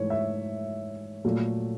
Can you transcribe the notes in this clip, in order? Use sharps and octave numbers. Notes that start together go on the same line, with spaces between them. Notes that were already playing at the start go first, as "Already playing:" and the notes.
Already playing: G#2 E3 A3 C#5
E5
A#2 F#3 A3